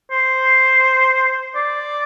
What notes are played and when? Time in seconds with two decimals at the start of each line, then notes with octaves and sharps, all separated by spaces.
0.11 C5
1.56 D5